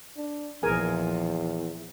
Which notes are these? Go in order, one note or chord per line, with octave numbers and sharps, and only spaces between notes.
D4
A#1 E2 F3 G#4 A#4 G#5